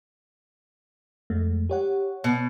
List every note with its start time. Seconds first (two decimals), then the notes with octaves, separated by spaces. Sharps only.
1.30 F2 G#3 A3
1.69 G4 C#5 F#5
2.24 B2